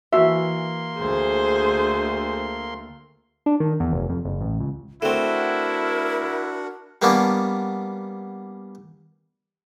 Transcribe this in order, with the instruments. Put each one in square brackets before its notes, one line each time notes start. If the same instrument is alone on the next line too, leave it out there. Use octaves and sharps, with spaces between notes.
[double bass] E3 [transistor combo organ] A#3 C6 [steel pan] F#4 E5
[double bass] D2 A3 [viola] G#4 C5
[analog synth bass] D4
D#3
E2
F1
F2
F#1
A1
C#2
[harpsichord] A3 C4 [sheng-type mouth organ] D4 F#4 F#5 [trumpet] E4 [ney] A#4
[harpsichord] G3 A#3 B3 C#4 D4